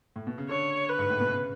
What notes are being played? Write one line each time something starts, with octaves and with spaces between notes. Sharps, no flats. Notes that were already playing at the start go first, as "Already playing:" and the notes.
A2
B2
C#3
D3 C#5
B4
G#2
A2
B2
C#3